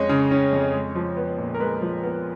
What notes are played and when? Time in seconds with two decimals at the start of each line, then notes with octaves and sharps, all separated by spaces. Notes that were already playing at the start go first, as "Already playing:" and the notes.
Already playing: F2 G#3 C#4 C#5 D#5
0.09 C#3
0.31 C#4
0.53 F2
0.73 G#3
0.95 F3
1.17 B3
1.38 A#2
1.54 A#4
1.60 G#3 B4
1.82 F3
2.03 B3